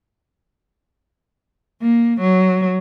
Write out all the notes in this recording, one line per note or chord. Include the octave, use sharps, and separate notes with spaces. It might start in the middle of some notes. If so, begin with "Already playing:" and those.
A#3
F#3